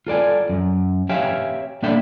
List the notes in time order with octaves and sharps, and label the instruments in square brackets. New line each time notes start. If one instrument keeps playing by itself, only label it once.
[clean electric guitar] F4 A4 D5 G#5
F#2
G4 C#5 E5 F5 G5 G#5
A#3 D4 A4 D5 E5 G5